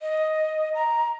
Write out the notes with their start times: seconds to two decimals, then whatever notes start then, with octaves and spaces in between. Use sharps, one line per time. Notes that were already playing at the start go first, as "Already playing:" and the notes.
0.02 D#5
0.74 A#5